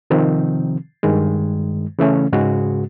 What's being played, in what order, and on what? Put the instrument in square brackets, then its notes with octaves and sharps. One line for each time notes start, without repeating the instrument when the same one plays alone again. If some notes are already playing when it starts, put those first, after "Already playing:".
[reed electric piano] C3 D#3 F3 C4
G2 D#3 G#3
C#3 E3 A3 C#4
G#2 C#3 G#3 F#4